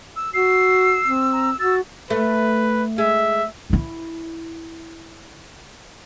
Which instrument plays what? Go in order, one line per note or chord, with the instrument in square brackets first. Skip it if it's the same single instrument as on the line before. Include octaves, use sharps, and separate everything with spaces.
[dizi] E6
[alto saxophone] F#4 [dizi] E6 [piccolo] C7
[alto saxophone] C4
[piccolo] A#5
[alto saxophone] F#4 [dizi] E6 [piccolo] A6
[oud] A3 [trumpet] B4
[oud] G#3 [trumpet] E5
[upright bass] D#4 E4